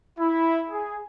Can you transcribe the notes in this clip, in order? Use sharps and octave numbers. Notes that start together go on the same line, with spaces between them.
E4
G#4